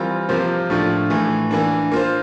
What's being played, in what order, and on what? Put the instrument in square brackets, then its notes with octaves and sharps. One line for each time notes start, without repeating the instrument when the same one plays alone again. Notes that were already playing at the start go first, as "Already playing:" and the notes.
Already playing: [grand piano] E3 G3 C4 F4 A#4
C3 F3 A#3 F4 C5
A2 F3 A3 D4 F4
A2 E3 A3
E3 A#3 D4
A#3 F4 C5